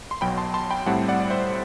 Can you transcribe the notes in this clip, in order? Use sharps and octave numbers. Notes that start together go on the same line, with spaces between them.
C6
B1 B2 F#3 G5 B5
A5 C6
A5 C6
G5 B5
A2 G3 C4 E4 F#5 A5
D5 F#5
D5
C5 E5